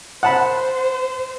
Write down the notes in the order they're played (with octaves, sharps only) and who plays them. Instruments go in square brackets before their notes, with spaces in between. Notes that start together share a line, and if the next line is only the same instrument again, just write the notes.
[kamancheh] C5 [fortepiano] F#5 A5 B5